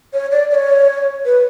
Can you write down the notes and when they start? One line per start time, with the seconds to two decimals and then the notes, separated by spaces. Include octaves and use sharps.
0.13 C#5
0.31 D5
0.51 D5
0.55 C#5
1.25 B4